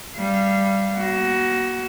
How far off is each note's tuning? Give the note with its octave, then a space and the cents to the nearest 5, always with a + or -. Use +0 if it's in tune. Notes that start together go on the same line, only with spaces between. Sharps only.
G3 +0 F5 -25
A#3 +40 F#4 +20